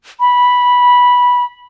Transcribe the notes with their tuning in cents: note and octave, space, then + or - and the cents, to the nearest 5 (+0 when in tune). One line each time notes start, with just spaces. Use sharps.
B5 -10